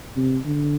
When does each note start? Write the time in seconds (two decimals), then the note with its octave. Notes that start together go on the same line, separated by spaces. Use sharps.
0.16 C3
0.46 D3